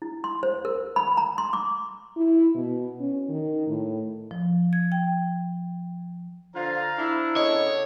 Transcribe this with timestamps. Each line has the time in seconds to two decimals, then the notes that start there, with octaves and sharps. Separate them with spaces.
0.02 E4
0.24 C6
0.43 C5
0.65 A#4
0.96 B5
1.17 A#5
1.38 C6
1.53 D6
2.16 E4
2.55 B2
3.00 C#4
3.29 D#3
3.68 A2
4.31 F3
4.73 G#6
4.92 G5
6.55 D3 F4 C5 F5 A#5
6.99 D4 E4
7.36 C#3 B3 A4 C#5 D#5